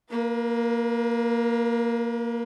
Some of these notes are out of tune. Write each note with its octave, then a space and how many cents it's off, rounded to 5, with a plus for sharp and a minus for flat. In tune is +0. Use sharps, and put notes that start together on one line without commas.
A#3 +0 B4 -45